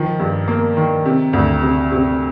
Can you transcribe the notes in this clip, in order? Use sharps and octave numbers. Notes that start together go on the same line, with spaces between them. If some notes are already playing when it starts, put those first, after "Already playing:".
Already playing: D#3 F3
G2
A#3
D#3
C3
D2
C3
C3